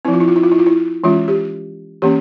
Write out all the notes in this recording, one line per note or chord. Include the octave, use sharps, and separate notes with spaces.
F3 C4 E4
F4
E4
F4
E4
F4
E4
F4
E4
E3 G#3 C#4 F4
G4
E3 A#3 C#4 G4